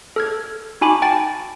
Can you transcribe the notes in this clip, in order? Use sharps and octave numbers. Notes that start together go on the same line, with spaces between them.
A4 F6 G#6
D#4 F#4 G#5 A5 B5 D6
G5 A5 A6